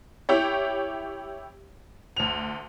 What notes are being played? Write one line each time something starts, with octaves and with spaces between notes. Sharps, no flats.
E4 G4 C#5
D2 F7